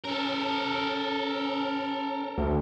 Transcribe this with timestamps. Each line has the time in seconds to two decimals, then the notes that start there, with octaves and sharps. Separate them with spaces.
0.04 C#4 A4 A#4
2.38 D2